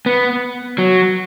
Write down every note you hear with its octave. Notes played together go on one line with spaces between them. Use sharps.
B3
F#3